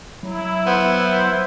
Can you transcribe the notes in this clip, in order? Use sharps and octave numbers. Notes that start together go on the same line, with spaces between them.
F#3 E4
B3 C5